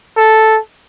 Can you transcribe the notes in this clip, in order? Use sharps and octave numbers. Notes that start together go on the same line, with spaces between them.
A4